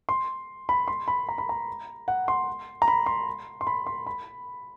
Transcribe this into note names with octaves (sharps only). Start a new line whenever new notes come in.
C6
B5
C6
B5
A#5
B5
A#5
F#5
C6
A#5
B5
C6
C6
B5
C6
B5